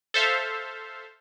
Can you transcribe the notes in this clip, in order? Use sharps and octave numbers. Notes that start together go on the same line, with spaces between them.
A4 C5 E5 F5